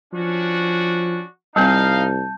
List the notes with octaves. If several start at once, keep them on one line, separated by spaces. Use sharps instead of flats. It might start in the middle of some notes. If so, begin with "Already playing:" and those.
F3 C#4 D4 F#4
C2 G3 C4 D#4 F5 A5 G6